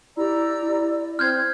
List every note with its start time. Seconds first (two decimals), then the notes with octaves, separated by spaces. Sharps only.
0.17 E4 G4 D5 A#5 E6
0.62 E4
1.19 C4 C6 F6 G6 G#6